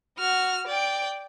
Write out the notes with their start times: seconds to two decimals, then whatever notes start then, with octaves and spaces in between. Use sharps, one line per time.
0.19 F#4 F6
0.67 D5 G5